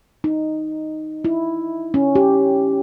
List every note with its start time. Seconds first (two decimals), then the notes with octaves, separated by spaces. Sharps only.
0.24 D#4
1.25 E4
1.94 C#4
2.15 G4